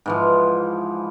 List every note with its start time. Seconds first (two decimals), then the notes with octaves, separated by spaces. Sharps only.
0.06 G#2 E3 F3